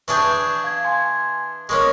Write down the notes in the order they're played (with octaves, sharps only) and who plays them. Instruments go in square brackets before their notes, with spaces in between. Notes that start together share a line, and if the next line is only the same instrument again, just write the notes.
[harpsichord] E3 D4 G#4 [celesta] C#6 G6
[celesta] F5 G#6
G#5 C6 G#6
[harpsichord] G#3 A#3 C#4 [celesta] C#6 D#6